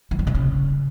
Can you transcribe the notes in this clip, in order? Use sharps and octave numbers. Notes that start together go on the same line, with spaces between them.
E3
G2
C3
C#3